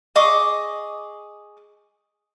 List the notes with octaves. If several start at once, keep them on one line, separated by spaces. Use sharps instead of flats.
G#4 D#5 C#6 D6